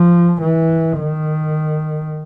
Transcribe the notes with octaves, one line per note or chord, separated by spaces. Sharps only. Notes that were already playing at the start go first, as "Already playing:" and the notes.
Already playing: F3
E3
D#3